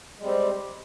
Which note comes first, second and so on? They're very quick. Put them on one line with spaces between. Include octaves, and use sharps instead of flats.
G#3 G3 C4 G4